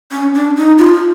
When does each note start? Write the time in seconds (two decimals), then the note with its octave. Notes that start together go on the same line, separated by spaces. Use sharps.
0.11 C#4
0.34 D4
0.57 D#4
0.78 F4